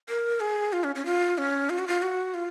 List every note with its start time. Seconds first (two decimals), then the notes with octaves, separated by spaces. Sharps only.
0.09 A#4
0.40 G#4
0.73 F4
0.84 C#4
0.95 C#4
1.06 F4
1.38 C#4
1.70 F4
1.79 F#4
1.88 F4
2.02 F#4
2.34 F4